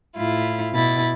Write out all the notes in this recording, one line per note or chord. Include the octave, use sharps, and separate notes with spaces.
A2 E4 F4
B2 E4 A6